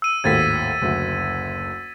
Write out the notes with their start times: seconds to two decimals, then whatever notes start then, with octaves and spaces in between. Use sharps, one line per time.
0.02 E6 D#7
0.24 G#1 D#2 A2 G#6 A6 B6
0.82 F#1 D2